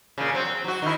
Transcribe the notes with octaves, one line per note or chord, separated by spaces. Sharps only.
A#2 C#3
F#3 C4
C4
F#3 F#4
D#3 E4